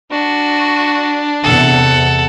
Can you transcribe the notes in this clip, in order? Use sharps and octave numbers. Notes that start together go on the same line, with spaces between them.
D4 F#4
E2 C3 A4 F#5